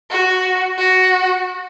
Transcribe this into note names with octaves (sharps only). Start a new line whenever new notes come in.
F#4
F#4